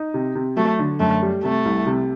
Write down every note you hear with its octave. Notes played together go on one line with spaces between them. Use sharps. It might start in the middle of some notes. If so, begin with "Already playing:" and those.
Already playing: D#4
C3
C3
F#3 A3
D3
F#2 A3
G3
C3 A3
C2
C3